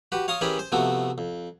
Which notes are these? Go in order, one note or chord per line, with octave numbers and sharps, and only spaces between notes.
F#4 G4 B4
C#5 F5 A#5 C6 D#6
E3 C#4 G4 G#4 A#4 B5
C5
C3 F3 A3 B3 F#4
F2